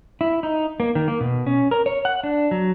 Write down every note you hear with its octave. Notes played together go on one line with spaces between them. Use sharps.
E4
D#4
A#3
D#3
A#3
B2
C#4
A#4
C#5
F#5
D4
F#3